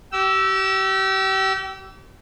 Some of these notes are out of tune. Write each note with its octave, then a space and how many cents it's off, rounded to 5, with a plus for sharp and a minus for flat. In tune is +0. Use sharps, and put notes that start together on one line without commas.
G4 -35 G5 -35 E6 +0